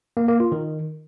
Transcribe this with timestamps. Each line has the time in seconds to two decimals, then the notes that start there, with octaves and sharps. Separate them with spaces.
0.17 A#3
0.28 A#3
0.40 F4
0.52 D#3